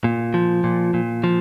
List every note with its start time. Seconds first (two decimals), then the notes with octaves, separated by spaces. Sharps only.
0.04 A#2
0.34 F3
0.64 A#2
0.94 A#2
1.24 F3